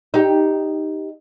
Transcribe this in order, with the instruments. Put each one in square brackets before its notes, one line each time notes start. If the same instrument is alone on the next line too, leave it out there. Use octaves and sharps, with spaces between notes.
[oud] D#4 G4